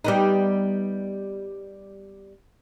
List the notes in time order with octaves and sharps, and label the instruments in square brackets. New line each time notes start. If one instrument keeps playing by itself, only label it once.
[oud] G3 B3 D#4